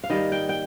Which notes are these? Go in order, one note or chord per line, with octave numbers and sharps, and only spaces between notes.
F5
D#3 G3 A#3 D#5
G5
G5